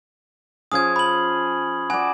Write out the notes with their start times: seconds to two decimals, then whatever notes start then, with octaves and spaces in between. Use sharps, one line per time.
0.72 F3 C#4 G#4 D#6 G#6
0.96 B5 F#7
1.90 F#4 D5 G#5